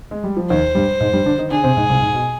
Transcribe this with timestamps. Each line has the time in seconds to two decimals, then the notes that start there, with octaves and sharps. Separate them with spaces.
0.11 G#3
0.24 G3
0.37 F3
0.49 D#2 D#3 C5
0.75 G2 G3
1.00 G#2 G#3
1.13 G2 G3
1.25 D3 D4
1.38 D#3 D#4
1.51 D3 D4 G#4
1.63 C3 C4
1.77 G#2 G#3
1.89 C2 C3
2.02 G#2
2.14 B2